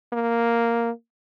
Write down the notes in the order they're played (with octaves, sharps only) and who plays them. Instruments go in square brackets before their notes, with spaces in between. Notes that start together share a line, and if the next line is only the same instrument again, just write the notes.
[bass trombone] A#3